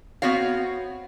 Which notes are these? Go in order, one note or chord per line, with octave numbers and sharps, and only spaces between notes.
B3 C4 F#4 C#5 F5